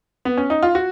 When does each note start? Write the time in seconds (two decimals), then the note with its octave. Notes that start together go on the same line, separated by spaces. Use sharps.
0.25 B3
0.37 C#4
0.50 D#4
0.63 F4
0.75 F#4